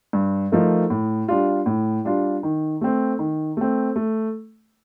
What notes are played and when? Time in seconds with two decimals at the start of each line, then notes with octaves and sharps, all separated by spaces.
0.13 G2
0.52 F3 A3 D#4 A#4
0.90 A2
1.28 G3 D4 F4
1.66 A2
2.05 G3 D4 F4
2.43 D#3
2.81 A3 C4
3.19 D#3
3.57 A3 C4
3.96 A3